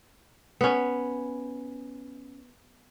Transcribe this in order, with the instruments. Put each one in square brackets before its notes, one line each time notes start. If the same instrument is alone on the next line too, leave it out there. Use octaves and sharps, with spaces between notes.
[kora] B3 C#4